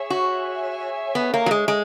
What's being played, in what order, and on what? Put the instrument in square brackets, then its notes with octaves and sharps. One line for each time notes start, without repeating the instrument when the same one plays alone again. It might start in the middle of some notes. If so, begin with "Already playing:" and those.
Already playing: [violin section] G#4 C#5 E5
[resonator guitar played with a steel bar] F#4
[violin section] G#4 C#5 E5 G#5
[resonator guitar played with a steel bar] B3
A#3
F#3
G#3
G#3